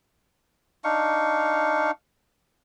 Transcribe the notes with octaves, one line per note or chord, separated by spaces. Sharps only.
D4 D#4 F5 C#6